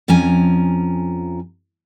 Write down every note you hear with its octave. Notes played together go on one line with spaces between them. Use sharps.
F2 F3 C#4 G#5 A#5